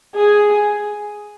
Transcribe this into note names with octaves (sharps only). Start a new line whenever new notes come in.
G#4